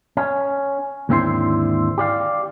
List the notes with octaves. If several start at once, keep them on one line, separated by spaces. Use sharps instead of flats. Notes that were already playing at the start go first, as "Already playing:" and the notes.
C#4
D#2 G#2 D3 C4 E4 C5
G4 D5 F5